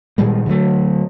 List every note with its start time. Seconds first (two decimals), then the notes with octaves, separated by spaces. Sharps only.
0.18 A#2 D#3 G3 G#3
0.46 D3 F#3 G#3 A3